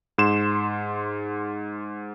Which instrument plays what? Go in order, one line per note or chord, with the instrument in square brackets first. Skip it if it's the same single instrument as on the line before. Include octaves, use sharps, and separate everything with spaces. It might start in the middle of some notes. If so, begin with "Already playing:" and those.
[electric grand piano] G#2 C6 E7